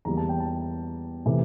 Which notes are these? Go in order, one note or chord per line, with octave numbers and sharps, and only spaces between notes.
E2 E3 G3 A#3 A#5
A5
G5
A5
C3 E3 A3